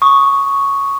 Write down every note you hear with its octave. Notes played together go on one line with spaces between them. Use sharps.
C#6 D#6